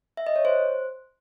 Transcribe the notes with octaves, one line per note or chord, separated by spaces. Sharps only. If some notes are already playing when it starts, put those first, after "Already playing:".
E5
D#5
C#5
C5